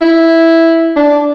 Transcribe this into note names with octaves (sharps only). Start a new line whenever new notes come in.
E4
D4